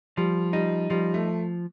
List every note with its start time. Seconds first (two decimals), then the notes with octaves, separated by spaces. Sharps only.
0.17 F3 G3
0.53 G3 D#4
0.90 F3 G3
1.14 A3